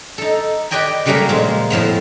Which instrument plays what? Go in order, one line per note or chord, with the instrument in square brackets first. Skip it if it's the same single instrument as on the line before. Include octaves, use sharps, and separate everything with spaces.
[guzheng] D#4 A4
G4 B4 D5 D#5 G5 G#5
C#3 F#3 G3 A3 A#3 G#4
A#2 F3 G#3 D#4
F2 A2 F3 B3